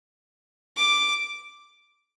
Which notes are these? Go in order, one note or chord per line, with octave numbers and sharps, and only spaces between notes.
D6